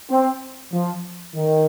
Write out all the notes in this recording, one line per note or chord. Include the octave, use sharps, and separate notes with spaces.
C4
F3
D#3